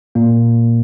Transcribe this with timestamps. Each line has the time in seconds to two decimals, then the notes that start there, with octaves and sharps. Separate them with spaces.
0.15 A#2 A#3